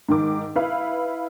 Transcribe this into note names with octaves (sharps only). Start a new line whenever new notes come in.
G#2 D#3 D6
E4 B4 F5